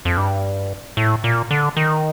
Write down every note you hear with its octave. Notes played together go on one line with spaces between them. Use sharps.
F2
G2
A2
A#2
D3
D#3